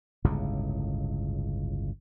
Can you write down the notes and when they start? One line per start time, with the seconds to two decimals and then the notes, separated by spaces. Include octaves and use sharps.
0.24 G1 C#2 A2 C#3